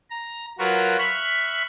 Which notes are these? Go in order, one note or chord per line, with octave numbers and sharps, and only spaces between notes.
A#5
F#3 F4 F#4 A#4 B4
E5 B5 C#6 F6 F#6